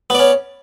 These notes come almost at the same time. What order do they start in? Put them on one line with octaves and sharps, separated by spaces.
B3 D5 C#4